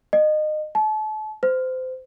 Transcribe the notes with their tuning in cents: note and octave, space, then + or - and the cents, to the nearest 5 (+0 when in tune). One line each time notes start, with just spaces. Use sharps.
D#5 -25
A5 -35
C5 -25